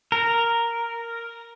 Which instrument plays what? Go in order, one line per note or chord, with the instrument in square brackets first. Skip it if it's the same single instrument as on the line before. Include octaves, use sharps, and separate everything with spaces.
[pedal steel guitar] A#4